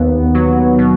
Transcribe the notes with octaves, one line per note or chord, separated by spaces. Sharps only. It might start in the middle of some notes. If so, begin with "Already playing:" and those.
Already playing: D#2 B3
F#3
B2